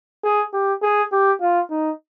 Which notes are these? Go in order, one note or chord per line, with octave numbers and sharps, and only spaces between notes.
G#4
G4
G#4
G4
F4
D#4